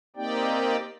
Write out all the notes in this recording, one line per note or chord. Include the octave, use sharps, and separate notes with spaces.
A#3 C4 D#4 G4 D5 G5